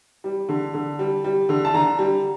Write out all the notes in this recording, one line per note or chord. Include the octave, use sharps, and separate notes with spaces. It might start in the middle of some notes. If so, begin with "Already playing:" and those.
G3
D3
D3
G3
G3
D3
A5
D3 A#5
G3